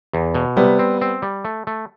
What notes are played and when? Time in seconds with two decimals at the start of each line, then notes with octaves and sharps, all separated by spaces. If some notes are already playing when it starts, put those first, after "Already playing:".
0.13 E2
0.34 B2
0.56 C3 G3 B3
0.79 C4
1.01 C4
1.22 G3
1.45 A3
1.67 A3